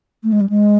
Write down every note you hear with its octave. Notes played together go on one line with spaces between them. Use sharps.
A3
G#3
G3
G#3